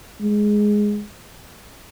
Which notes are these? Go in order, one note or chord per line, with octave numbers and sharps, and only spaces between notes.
G#3